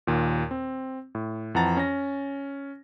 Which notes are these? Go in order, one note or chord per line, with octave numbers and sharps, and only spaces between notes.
D#2 A#2
C4
A2
F2 E3 F#5 A5 A#5 A6
C#4 A#6